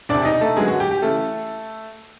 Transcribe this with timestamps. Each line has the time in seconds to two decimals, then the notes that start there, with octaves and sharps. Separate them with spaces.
0.09 E1 D2 C3 D4 D5
0.25 D#4 D#5
0.41 A3 A4
0.56 F#2 D3 F#3 G#3 B3 G#4
0.68 F#4
0.80 G4
0.91 G4
1.02 C#3 E3 A3 A4